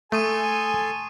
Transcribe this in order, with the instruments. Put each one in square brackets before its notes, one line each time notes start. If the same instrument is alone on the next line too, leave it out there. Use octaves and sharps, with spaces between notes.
[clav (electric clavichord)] A3 [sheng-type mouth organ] A4 C6 [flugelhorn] G#5 [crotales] C#6 D#6 D#7